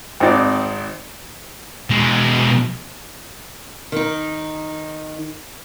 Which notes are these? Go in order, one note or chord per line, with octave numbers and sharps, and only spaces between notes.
G#1 C4 D#4 D5
B2 G#3
D#3 D#4